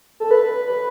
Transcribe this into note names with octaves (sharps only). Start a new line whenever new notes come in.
A4
B4
B4